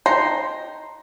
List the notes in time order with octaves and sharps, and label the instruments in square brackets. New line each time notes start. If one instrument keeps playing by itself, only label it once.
[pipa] D#4 G5 A#5 C6